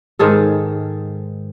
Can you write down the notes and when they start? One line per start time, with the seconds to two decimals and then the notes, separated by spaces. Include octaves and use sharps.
0.19 G#2 D#3 G#4 A4